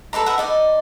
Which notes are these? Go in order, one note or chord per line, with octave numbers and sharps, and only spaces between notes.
A4 B4 D5 A#5
B4 E5 F#5
D#4 D5 D#5